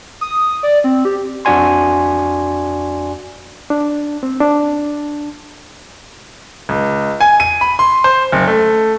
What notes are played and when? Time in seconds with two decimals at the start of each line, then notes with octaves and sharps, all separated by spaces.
0.21 D#6
0.63 D5
0.84 C4
1.05 G4
1.45 F2 D4 F#4 D5 G#5 C6
3.70 D4
4.23 C4
4.40 D4
6.69 C#2
7.21 G#5
7.40 D#7
7.61 B5
7.79 C6
8.04 C5
8.32 F#1
8.47 A3